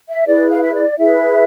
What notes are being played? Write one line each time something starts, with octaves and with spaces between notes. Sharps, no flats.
E5
E4 G#4 B4 D5
F5
E5
D5
E4 G#4 B4 E5